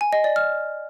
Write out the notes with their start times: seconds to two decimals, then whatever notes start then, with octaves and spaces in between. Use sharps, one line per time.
0.01 G#5
0.13 D#5
0.24 D5
0.36 F6